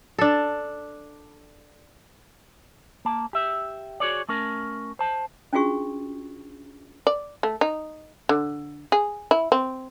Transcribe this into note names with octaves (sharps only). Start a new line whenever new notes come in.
D4 A4
A#3 A5
G4 E5
F#4 G#4 C#5 D5
A3 C#4 A#4
C5 A5
C#4 D4 F4 F#4 G#4 C#6
D5
A3
D#4
D3
G#4
E4
C4